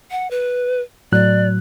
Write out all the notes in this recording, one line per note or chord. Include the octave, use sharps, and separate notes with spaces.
F#5
B4
A2 F#3 D5 F#6